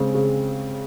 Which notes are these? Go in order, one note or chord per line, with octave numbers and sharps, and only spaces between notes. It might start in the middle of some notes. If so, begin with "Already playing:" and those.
Already playing: C#3 G#3 C4
C#3